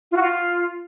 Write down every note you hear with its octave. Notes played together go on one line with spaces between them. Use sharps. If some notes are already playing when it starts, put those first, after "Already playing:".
F4
F#4
F4